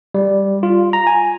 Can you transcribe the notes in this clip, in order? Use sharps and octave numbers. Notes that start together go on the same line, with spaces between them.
G3
F4
A#5
G#5